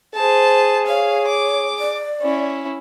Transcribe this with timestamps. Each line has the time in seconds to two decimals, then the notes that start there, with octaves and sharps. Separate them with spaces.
0.15 G#4 C5 A5
0.87 C#5 F5
1.28 D6
1.79 D5
2.22 C#4 E4